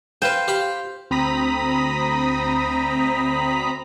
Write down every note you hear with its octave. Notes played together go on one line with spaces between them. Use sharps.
B4 C5 F5 G5
G4 F5 B5
D2 C4 A#5 B5 D#6 B6